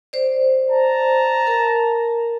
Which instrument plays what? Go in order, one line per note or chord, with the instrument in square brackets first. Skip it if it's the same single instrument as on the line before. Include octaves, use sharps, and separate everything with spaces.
[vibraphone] C5 D5
[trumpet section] A5 A#5
[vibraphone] A#4